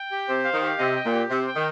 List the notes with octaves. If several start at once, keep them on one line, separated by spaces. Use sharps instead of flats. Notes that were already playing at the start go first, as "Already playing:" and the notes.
Already playing: G5
G4
C3 C5
F5
D#3
G4
C3 D#5
G5
A#2
G4
C3 C5
G5
D#3